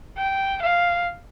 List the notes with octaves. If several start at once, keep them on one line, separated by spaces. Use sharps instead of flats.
G5
F5